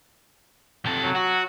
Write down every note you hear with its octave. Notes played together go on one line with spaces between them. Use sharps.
C3 A4
F#3
F#4